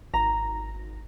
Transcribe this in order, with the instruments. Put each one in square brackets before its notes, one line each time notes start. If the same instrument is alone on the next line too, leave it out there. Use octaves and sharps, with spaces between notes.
[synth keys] G#1 A#6 [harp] A#5